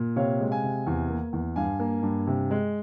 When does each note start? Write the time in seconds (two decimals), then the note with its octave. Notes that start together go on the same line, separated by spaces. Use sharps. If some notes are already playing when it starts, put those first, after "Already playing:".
Already playing: A#2
0.16 C3 C#5 F5
0.40 G#3
0.51 F5 G#5
0.63 C3
0.87 E2
1.09 A#3
1.33 E2
1.56 G2 F5 G#5
1.79 A#3
2.03 G2
2.27 C3
2.51 G#3